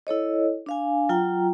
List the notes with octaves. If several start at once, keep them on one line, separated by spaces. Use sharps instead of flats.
E4 A4 C#5 D#5
D4 F5 G#5
F#3 F4 G5 A#5